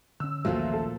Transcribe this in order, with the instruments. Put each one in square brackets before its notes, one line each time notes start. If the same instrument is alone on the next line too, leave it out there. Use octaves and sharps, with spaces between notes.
[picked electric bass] D3 C#4 [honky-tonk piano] E6
[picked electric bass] A#1 D#2 C#4 [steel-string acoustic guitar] A#2 F3 A3 [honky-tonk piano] F#3 F4
[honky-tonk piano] A4